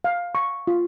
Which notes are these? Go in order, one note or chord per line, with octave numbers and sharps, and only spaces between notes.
F5
C#6
F4